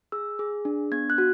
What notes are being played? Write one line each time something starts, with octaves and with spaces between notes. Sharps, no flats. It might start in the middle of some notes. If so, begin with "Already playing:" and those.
G#4 E6
G#4
D4
B3 G#6
F#6
F#4